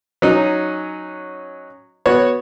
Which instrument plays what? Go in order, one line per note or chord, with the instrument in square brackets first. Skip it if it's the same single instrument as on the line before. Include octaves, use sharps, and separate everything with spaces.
[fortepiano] F#3 C#4 D#4
B3 F#4 C#5